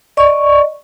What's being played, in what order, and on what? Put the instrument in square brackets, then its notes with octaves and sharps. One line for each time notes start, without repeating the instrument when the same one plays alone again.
[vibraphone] D5 D#5 C#6